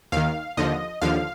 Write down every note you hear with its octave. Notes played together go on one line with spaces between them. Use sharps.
D#2 D#3 F5
D#2 D3 F3 D#5
D#2 D3 F3 F5